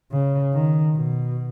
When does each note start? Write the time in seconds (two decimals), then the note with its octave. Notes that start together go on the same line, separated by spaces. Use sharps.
0.12 C#3
0.53 D#3
0.95 B2